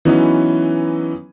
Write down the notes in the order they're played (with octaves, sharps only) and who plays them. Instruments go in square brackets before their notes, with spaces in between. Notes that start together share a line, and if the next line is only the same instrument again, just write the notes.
[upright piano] E3 F#3 B3 C#4 D#4 E4